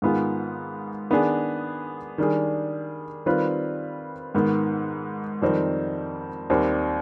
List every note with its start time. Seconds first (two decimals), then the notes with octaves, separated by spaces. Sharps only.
0.02 G#2 D#3 B3 F4 G#4
1.10 D#3 B3 D4 G#4
2.18 D#3 G3 D4 G#4
3.26 D#3 G3 C4 F4 B4
4.35 G#2 D#3 B3
5.42 F2 D#3 G3 C4 D#4
6.50 D#2 D#3 G3 C4 G4